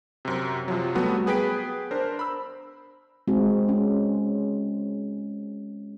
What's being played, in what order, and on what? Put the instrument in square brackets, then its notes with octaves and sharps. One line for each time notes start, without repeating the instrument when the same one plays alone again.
[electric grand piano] F#2 C3
C3 F3 F#3
F#3 G3 A3 B3 F#4
B3 G#4 B4 G5 B6 D7
D4 A#4 C5
B5 E6
[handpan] G#3 C4 F#4
C#4